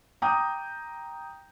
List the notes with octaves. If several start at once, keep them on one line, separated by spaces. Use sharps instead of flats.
G5 A#5 D6 D#6 G6